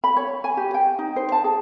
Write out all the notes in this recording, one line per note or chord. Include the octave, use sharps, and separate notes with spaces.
B5
C#5
G#5
G4
G5
D#4
C5
A5
G#4